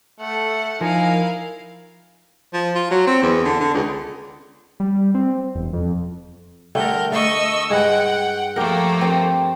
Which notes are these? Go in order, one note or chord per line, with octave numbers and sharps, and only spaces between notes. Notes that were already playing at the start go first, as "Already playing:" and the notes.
A3 A4 F#5
F3 D#4 E4 A#4 F5 G#5
F3
F4
F#3
C4
E2
D3
D3
C#2
G3
C4
E1
F2
D3 G3 A3 A#4 G6
A3 D#5 C#6 E6
G2 G#3 F#5 G5
F3 A3 A#3 G4 A#4
C4 G4